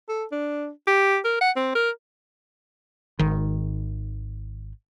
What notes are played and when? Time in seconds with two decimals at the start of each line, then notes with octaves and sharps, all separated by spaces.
0.09 A4
0.32 D4
0.87 G4
1.25 A#4
1.41 F#5
1.56 C4
1.75 A#4
3.19 G#1 D#3